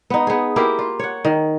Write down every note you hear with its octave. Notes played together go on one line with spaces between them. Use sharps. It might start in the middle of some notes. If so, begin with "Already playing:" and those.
B3 D#4
B3 G#4
A#3 E4 G4 A#4
F4
C#5 F#5
D#3